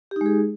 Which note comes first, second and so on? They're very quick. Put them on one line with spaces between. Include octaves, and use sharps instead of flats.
G4 D#4 G#3 G#4